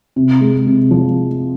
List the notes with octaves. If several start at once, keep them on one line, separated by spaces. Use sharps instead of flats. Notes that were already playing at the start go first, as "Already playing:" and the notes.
C3
G#3
C3
F3